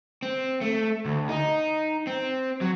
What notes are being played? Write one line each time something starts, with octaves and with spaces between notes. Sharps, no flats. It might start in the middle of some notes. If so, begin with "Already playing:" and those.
C4
A3
D2
D#4
C4
F#3